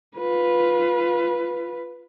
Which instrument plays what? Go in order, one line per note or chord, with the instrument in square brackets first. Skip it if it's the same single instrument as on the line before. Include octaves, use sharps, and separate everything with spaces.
[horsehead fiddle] F4 B4